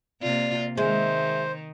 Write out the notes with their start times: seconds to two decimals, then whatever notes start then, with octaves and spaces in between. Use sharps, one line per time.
0.22 C3 A#3 F4 D5
0.77 D#3 G#3 C5 E5